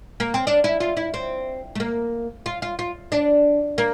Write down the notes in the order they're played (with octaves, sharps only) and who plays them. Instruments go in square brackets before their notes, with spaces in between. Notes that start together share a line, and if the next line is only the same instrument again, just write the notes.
[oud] A#3
C4
D4
E4
F4
E4
C4
A3
A#3
F4
F4
F4
D4
A#3